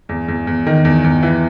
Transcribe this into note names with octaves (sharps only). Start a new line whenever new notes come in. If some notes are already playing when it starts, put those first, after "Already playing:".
E2
E2
E2
D#3
E2
E2
E3